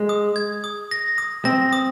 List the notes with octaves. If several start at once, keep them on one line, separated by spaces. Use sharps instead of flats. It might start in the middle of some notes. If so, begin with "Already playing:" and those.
Already playing: G#3
D#6
G#6
D#6
A#6
D#6
C4 A#6
D#6